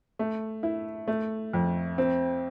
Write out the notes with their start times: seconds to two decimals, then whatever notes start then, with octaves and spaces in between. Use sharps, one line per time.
0.19 A3
0.63 E4
1.08 A3
1.53 F2
1.98 C4